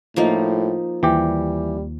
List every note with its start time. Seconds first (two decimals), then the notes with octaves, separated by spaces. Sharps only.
0.16 A2 F3 A#3 D#4
1.03 D#2 E3 G3 G4